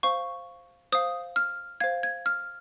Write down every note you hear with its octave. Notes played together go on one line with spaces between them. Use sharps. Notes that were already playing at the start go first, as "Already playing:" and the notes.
C5 F5 C#6
C5 F5 D#6
F6
C5 F5 G#6
G#6
F6